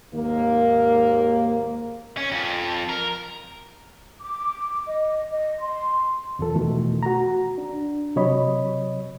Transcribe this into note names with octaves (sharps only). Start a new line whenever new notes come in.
D#2 G#2 A#3
C#4
F2
A#4
D6
D#5
D#5
C6
E2 B2 E3 F3 A4
B2 D#3 E3 A3
F#4 A#5
D4
C3 F#3 C#5 D#5 B5